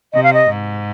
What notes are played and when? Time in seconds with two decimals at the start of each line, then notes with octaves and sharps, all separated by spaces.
0.13 C3 D#5
0.23 F5
0.33 D#5
0.49 G#2